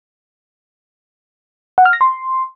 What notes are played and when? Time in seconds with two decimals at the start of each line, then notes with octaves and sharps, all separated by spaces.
1.78 F#5
1.85 F6
1.93 A#6
2.01 C6